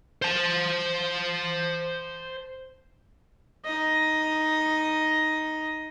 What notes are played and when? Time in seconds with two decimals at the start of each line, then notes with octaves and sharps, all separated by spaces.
0.22 C5 A5
3.65 D#4 D#5